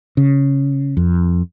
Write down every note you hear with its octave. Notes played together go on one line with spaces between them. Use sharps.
C#3
F2